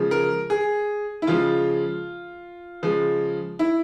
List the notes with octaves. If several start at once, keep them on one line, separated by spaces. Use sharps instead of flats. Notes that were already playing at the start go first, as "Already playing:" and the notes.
Already playing: C#3 F3 G#3
A#4
G#4
E4
C#3 F3 G#3 F4
C#3 F3 G#3
E4